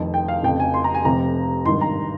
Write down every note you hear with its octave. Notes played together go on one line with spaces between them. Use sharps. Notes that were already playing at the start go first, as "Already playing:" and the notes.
Already playing: F1 F2 D#3
G5
F5
F1 F2 C#3 G5
G#5
C6
A#5
G#5
F1 F2 C3 A#5
G#1 G2 D#3 C6
A#5